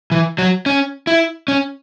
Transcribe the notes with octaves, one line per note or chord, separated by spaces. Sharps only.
E3
F#3
C#4
E4
C#4